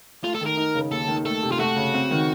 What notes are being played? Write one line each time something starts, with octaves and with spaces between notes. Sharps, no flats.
A3 F4
A4
D#3 A#4
D#4
C#3
D#2 A4
D#3
A3 A4
C3
F4
A3 F#4
C#3
C4
D#3